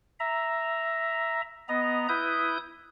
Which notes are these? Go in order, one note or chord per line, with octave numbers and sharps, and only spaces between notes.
E5 A#5
B3 D#5 A#5
E4 B4 D#6 G6